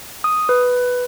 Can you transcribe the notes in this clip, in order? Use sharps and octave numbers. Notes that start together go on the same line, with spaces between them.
D#6
B4